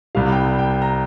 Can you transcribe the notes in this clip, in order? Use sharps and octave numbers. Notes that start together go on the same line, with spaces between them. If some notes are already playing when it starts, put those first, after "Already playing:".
C2 C3 G3 F5
G5
F5
G5
A#5